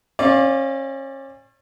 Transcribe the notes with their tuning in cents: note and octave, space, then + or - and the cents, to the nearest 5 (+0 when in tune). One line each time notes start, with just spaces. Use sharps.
C#4 -35 D5 +0 F5 +0